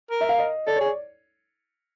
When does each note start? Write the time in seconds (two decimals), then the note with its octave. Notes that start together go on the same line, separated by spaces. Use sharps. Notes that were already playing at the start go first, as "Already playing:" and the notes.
0.11 A#4
0.21 E5
0.29 F5
0.38 D#5
0.67 A4 D5
0.76 G#4 C#5
0.86 D5